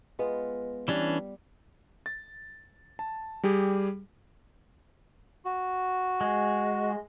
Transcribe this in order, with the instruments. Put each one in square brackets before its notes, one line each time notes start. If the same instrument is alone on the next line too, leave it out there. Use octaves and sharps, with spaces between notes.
[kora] G#3 B3 F4
[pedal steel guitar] E3 C#4 D4 [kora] G3 D5
[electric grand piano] A6
A5
G3 G4 G#4
[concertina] F#4
[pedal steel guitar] G#3